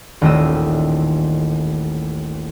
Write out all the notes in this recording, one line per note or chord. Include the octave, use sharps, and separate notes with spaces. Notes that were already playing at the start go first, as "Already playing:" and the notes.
D#1 A1 D#3 A3 D#5 E6